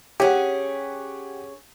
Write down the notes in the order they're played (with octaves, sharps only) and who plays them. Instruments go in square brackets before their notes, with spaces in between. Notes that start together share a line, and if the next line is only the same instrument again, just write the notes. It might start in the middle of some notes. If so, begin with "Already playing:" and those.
[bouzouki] C#4 G#4 [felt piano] G4 F#5